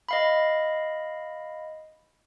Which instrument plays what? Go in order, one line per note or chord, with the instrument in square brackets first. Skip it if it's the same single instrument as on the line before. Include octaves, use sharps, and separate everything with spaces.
[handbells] D#5 F5 B5